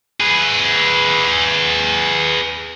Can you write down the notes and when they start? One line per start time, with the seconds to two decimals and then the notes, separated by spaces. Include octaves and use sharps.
0.20 G#4 B4